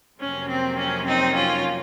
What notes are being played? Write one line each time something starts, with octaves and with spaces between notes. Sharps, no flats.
F2 C3 F#3 A#3 C#4
C4
C#4
C4 D#4
C#4 F4